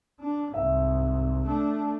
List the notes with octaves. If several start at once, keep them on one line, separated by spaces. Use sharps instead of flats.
D4
C2 G#2 E5
A3 D4